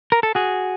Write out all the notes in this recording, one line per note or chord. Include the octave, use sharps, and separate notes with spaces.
A#4
A4
F#4 G#4